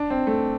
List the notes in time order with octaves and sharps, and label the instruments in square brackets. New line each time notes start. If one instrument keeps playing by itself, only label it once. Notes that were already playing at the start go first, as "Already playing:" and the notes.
Already playing: [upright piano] D4
C4
A3